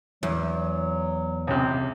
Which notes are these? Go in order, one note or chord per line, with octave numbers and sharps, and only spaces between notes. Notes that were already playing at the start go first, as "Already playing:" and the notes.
E2 F#3
C#2 C3